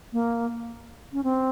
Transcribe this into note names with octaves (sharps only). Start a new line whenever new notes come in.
A#3
C#4
C4